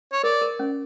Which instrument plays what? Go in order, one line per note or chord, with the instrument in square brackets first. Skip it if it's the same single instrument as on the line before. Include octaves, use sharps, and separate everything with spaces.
[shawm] C#5
[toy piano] A#4 [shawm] D5
[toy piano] A#4
C#4